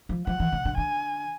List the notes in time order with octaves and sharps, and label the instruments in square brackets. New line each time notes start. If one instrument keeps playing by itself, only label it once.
[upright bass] F3
[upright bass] F3 [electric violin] F#5
[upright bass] E3
D3
D3
[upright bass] D3 [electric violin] G#5